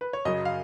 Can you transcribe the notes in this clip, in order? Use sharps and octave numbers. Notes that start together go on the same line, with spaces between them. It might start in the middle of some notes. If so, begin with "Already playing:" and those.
B4
C#5
F#2 C#3 F#3 D#5
F5